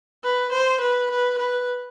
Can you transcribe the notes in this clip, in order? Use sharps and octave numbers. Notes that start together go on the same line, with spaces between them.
B4
C5
B4
B4
B4